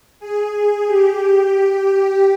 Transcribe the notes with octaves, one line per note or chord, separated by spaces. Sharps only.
G#4
G#4
G4